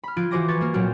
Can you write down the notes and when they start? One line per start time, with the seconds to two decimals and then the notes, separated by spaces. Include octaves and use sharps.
0.04 B5 F6
0.17 F3 F4 F#6 G#6 D7
0.31 E3 F#4 G#4 C5 D6 A#6
0.48 B4 C#6 G#6 A6
0.61 A#3 A#4
0.74 A#2 F#3 C4 F#4 F6